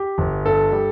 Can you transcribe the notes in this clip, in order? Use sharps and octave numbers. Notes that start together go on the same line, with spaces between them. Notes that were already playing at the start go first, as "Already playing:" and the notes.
Already playing: G4
G1
G2 A4
G3